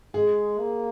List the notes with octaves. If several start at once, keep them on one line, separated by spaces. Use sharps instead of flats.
G#3 G#4
A#3